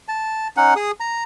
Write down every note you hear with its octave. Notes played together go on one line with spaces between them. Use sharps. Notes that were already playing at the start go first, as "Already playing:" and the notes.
A5
C#4 D#4 F#5
G#4 D#6
A#5